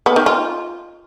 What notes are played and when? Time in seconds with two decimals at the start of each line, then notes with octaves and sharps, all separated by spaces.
0.06 B3
0.16 D#3
0.26 F4